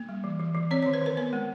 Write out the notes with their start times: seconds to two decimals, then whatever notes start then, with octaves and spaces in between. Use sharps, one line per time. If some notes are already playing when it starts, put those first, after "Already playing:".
Already playing: A#3
0.09 G3
0.24 E3
0.39 E3
0.55 E3
0.71 C4 C#5
0.83 D#3 C#5
0.94 B4
1.02 D#3 A#4
1.17 B3 A#4
1.33 G#3